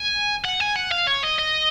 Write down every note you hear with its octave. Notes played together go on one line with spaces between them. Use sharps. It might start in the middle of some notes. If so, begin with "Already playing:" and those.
Already playing: G#5
F#5
G#5
F#5
F5
C#5
D#5
D#5